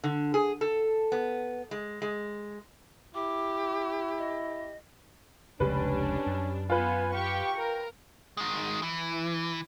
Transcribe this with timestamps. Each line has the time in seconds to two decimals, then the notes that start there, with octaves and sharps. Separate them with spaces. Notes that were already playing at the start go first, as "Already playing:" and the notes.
0.04 D3
0.34 G#4
0.61 A4
1.12 B3
1.71 G#3
2.02 G#3
3.15 E4 G4 D6
4.18 D#5
5.60 F1 C#2 C#3 G3 C#4 D4 B4
6.27 F#2
6.70 B3 F4 B4 G#5
7.14 G4 G5 C#6
7.57 A#4
8.37 D#3 G#3
8.83 E3